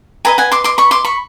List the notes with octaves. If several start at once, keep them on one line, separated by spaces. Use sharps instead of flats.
G4 B4 D#5 G#5 A#5
F#5 G#5
C6 D6
C6 D6
B5 C#6
C6 D6
B5 C#6